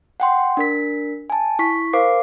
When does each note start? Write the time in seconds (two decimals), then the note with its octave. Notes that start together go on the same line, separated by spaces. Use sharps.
0.20 F#5 G5 C6
0.57 D4 A#4 B6
1.30 G#5 A5
1.59 E4 C#6 B6
1.93 A#4 C5 F5 D6 C7